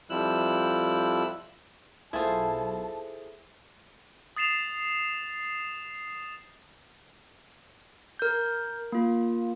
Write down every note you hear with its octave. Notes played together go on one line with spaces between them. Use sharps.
F2 F3 G3 E4 E6 F#6
B1 E4 F4 G#4 A4 C5 A5
D#6 A6 C7 E7 F7
A#4 G6
A#3 F4